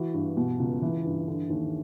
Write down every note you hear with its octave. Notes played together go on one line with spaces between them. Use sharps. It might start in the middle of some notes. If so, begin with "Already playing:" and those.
Already playing: E3 F#4
G2
B2
C#2
E3
G2
D3
D#2